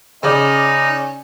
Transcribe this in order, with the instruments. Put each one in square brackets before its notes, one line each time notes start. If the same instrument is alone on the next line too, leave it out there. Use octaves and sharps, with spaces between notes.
[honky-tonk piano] C#3 D5 [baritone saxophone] C#4 [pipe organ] D#4